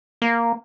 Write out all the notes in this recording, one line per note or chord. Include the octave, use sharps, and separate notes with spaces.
A#3